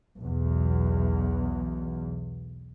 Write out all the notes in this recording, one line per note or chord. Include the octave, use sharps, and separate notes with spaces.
B1 E2